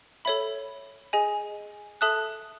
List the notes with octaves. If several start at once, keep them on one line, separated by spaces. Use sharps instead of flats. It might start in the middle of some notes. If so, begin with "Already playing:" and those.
A4 C#5 E5 B5
G#4 D#5 G#5
A4 E5 A5 D#6 F#6